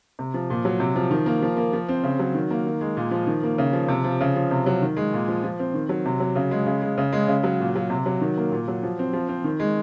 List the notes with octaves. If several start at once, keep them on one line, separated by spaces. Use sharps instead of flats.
C3
F3
A#2
F#3
C3
F3
D#3
A#3
F3
A#3
F3
C4
C#3
F#3
D#3
A#3
D#3
G#3
A#2
F3
D#3
A#3
C#3
F3
C3
F3
C#3
F3
C3
F#3
D#3
G#3
A#2
F3
F3
C4
D#3
F#3
C3
F#3
C#3
G#3
C#3
G#3
C#3
G#3
C#3
F#3
A#2
F#3
C3
F#3
D#3
A#3
A#2
F#3
F3
C4
F3
C4
D#3
G#3